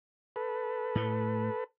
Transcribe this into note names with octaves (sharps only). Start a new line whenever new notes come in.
A4 B4
A2 A3